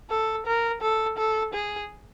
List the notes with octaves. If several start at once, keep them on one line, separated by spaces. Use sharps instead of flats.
A4
A#4
A4
A4
G#4